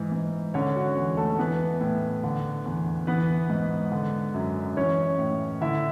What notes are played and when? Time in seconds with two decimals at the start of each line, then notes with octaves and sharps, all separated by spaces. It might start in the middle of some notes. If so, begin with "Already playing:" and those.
Already playing: G#2 E3
0.12 G#2
0.54 D3 C#4 C#5
0.76 F#4
0.96 E2
1.17 A3 A4
1.39 E3 B3 B4
1.81 A2
2.24 D3
2.65 E2
3.07 E3 B3 B4
3.50 G#2
3.92 D3
4.34 F#2
4.77 E3 C#4 C#5
5.19 A2
5.61 D3 E4 E5